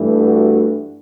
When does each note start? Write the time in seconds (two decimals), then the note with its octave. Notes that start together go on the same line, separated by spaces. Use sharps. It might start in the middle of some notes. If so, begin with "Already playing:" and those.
Already playing: G2 E3 A3
0.18 F#4